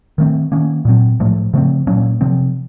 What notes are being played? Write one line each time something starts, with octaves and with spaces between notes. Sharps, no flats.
D#3 A3 C4
D#3 A#3 C#4
A#2 F#3 C4
A2 F3 A3
C#3 F3 A3 C4
A#2 F#3 A#3 C#4
C3 F3 C4